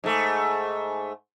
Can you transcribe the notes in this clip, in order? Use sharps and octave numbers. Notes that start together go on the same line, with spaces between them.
G#2 A3